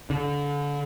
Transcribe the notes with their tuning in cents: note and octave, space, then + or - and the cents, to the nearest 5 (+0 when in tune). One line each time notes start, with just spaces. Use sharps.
D3 -30